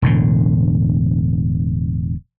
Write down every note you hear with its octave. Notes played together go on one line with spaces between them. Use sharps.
E1 A2 D3